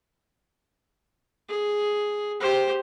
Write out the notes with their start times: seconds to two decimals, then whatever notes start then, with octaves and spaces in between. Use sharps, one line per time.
1.49 G#4
2.40 G4 C5